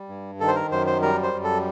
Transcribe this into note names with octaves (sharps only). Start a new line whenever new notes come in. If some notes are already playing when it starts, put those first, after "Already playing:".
Already playing: G3
G2
D#3 A4
C5
A#4
F#2 C5
C5
G3 A#4
C5
F#2
A4